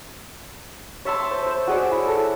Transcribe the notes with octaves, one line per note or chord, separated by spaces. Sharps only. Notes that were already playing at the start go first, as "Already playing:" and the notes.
C#5 E5 A5 C6
C5
C5
F#4 G#4 C#5 D5
E4
A4